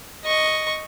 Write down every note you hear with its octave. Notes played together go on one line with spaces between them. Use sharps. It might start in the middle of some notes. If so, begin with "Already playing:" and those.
D#5 C#6